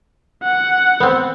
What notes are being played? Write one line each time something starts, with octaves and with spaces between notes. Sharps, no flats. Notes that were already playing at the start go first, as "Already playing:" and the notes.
F#5
B3 C4